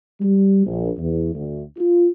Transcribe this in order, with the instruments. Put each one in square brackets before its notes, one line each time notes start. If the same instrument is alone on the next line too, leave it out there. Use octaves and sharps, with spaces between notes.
[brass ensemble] G3
A#1
E2
D2
F4